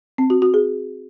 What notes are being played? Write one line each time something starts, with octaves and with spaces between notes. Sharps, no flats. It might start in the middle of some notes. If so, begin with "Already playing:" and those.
C4
F#4
F#4
G#4